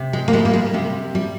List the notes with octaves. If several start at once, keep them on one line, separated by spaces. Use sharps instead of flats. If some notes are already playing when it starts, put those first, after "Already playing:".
Already playing: C3
G#3
A#3
G3 G#3
A#3
G#3
C3 G3
G3